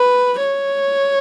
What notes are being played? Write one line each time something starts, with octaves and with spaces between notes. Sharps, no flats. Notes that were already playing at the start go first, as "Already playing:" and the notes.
Already playing: B4
C#5